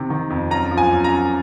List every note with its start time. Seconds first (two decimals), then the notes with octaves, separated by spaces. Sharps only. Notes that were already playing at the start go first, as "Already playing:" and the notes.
Already playing: C3 D#3
0.10 D#3
0.30 F2
0.50 F#2 A#5
0.71 F3
0.78 G#5
0.91 F#2
1.04 A#5
1.11 F#2